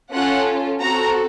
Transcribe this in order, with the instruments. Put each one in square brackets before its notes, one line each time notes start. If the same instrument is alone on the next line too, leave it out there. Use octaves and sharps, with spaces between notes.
[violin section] C#4 F4 A4 F#5
C4 F#4 A4 A#5